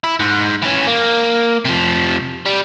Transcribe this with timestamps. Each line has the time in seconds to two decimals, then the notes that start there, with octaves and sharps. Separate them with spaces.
0.04 E4
0.20 G#2
0.62 E3 C#4
0.87 A#3
1.65 C3 F3
2.46 G3